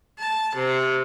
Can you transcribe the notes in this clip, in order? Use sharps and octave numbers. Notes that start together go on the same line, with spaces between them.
A5
C3